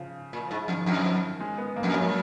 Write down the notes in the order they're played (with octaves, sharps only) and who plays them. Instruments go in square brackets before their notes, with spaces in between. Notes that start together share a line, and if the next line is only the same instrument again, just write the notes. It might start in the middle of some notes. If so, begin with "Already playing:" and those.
Already playing: [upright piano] C#3 F3
[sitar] A#2
[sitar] G#2 [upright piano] F3
[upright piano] F3
[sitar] F2
[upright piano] D#3
[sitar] F2 [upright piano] F3
[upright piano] F3
F3
G#3
B3
A#3
[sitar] F2
[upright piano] G#3
[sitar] F#2 [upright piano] F#3